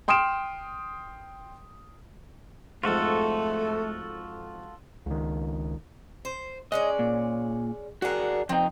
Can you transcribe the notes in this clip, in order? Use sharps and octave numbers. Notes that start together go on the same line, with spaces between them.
G5 C6 D#6 F6 D7 E7
F2 G#2 A3 F4 F#4 A4
C#2 D#3
C5
G#3 C#4 D5 D#5
A#2
D4 F#4 G#4 A#4 F#5
F2 C4 D#4